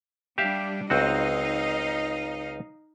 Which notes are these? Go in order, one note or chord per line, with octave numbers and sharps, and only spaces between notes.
G3 D4 G4 E5 F5
C#2 C4 D#4 F#4 D#5 F5